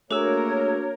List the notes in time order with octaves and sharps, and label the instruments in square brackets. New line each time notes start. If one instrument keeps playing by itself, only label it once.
[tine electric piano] A3 G#4 E6 [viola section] A#3 A#4 [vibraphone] D4 F#4 [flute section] C#5